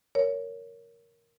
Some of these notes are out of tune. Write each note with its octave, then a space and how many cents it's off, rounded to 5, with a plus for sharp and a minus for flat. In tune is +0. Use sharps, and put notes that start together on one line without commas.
A#4 +0 C#5 +10